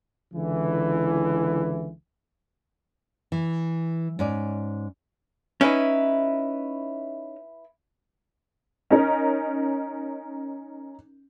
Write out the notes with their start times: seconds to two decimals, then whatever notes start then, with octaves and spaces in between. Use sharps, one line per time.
0.33 C#2 D3 E3
3.32 E3
4.19 G#2 C#4 D5
5.61 C#4 D#4 E4 B4
8.91 C#4 D#4 A#4